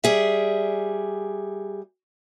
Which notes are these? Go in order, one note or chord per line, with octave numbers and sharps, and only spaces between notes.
G3 G#4 E5